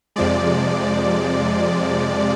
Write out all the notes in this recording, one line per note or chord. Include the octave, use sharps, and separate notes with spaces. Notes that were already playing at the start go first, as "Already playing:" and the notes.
F2 C3 F3 G#3 D5